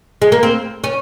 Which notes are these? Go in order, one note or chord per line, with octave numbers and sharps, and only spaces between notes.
G#3
A#3
C4
C#4